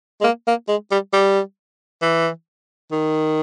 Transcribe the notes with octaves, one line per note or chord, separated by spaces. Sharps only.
G#3
A#3
A#3
G#3
G3
G3
E3
D#3